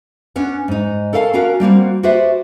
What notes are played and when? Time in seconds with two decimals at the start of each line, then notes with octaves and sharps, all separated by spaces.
0.36 B3 C#4 D4
0.68 G#2 D#4
1.13 A4 A#4 C#5 F5 G#5 A5
1.33 C#4 D4 F#4 A#4 F5
1.60 G3 A#3 C4 F#4
2.03 F#4 G4 B4 C5 D5 E5